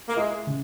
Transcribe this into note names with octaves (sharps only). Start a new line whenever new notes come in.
A#3
G#3 E4
C#3